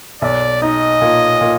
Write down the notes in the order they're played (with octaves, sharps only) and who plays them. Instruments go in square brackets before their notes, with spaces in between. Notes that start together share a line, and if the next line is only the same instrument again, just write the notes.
[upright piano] B1 [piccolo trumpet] D5
[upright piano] D#4 [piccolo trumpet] D#5
[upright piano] A#2
A#2